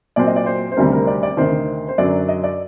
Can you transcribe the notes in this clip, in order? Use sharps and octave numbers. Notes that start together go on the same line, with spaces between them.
A#2 F#3 C4 D5
D#5
D5
C5
C5
D2 C3 D#3 G3 C4 A#4
A#4
D5
D5
D2 C3 D#3 C5
C5
F#2 D3 F#3 D5
D#5
D5